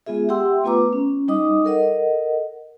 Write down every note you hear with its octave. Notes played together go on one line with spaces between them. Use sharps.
G#3 B3 F4 G#4 E5
G4 E5 F#5 G5 C6 E6
A3 B3 F4 B4 A#5 D6
C#4
G3 D#4 D#5 D6 D#6
A4 A#4 D#5 F#5